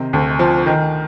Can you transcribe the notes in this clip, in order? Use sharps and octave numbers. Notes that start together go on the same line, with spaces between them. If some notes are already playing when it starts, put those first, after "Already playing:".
Already playing: C3 D#3
D2
F3
D#3